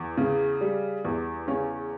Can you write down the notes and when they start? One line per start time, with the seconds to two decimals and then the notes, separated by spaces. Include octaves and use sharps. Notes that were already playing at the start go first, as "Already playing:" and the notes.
Already playing: E2
0.17 C#3
0.61 G3
1.05 E2
1.48 C#3 C#4